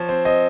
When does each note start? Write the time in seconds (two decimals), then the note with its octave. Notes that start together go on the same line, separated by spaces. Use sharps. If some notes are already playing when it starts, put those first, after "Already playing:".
Already playing: F3 C#5
0.09 C4
0.25 C4 D#5